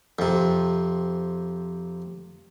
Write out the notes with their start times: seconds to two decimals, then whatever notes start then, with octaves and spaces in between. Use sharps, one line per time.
0.19 F2 C3